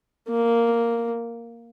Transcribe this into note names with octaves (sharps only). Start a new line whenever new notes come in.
A#3